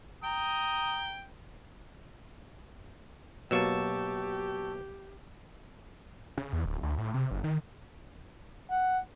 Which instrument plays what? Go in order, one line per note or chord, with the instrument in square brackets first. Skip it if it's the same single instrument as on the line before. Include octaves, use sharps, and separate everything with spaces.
[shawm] G5 [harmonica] A#5 [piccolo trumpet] D#6
[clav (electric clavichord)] B2 F#3 A#3 [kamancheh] G4 [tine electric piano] A5 C#6 E6
[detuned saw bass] C#3
E2
D1
D2
A2
C3
G1
D#3
[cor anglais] F#5